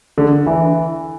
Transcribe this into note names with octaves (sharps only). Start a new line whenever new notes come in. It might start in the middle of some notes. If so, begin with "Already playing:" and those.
D3
E3